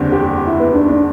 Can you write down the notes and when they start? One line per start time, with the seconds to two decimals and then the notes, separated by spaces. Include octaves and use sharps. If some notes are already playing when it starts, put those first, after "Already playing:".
Already playing: F#1 E2 D3 G3 C4
0.12 G4
0.46 E4
0.60 B3
0.74 D4
0.89 D4